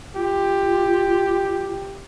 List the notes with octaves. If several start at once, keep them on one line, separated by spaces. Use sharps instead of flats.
F4 G4